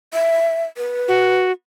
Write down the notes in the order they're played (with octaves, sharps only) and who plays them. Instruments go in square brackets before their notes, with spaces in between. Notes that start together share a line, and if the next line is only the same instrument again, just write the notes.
[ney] E5
B4
[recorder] F#4